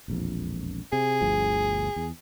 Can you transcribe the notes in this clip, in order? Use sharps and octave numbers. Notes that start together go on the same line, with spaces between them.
E1 A#1 F2
C3 G#4
G1 D2 F3
E2